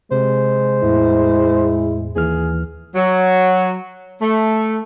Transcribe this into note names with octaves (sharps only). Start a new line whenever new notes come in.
C3 G#3 C5
E2 A2 E4
D#2 E3 G#4 F6
F#3
A3